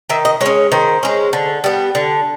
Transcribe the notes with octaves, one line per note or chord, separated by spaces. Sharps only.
D#3 E5
D#5
G#3 C#5
C#4
D#3 C5
G#3 C#4
D3
G3 B3
D3